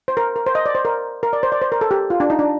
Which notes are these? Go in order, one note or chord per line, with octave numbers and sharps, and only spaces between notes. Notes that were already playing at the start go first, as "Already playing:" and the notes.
C5
A#4
A#4
C5
D#5
D5
C5
A#4
A#4
D5
C5
D5
C5
A#4
A4
G4
F4
D4
D#4
D4